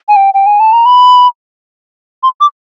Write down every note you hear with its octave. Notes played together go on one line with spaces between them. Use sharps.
G#5
G5
G5
G#5
A5
A#5
B5
C6
D6